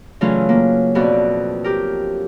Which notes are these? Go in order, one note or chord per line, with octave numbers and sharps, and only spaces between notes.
C#3 E3 F#3 A3 C#4 F4
A#3
F2 B2 D4 F#4
G4 A#4